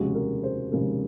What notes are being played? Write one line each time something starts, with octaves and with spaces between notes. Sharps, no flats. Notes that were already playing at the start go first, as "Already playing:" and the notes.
Already playing: F1 D#2 C#3 G#3 F#4
A#4
C5
F1 D#2 C#3 G#3 A#4